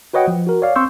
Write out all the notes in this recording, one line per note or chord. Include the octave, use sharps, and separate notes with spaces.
F#4 B4 C#5 D#5 F#5 G5
F3
F#4 A#4
C#5 D5 F5
C4 C6 C#6 E6 G6